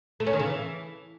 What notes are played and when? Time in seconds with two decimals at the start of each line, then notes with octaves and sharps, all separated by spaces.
0.20 A3
0.27 C#4
0.33 D#3
0.39 C#3
0.46 E3